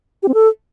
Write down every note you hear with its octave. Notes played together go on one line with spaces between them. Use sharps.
G4
C4
A4